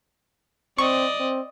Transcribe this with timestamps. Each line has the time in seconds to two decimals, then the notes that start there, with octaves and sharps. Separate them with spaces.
0.78 C4 D5 D#5 C#6
1.20 C4